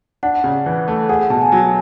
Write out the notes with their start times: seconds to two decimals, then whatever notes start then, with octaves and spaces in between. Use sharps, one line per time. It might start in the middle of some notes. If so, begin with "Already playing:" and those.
0.23 D4 F#5
0.44 C#3
0.66 E3
0.88 A3
1.09 G#4 F#5
1.20 F#5
1.30 B2 A5
1.41 G#5
1.52 F#3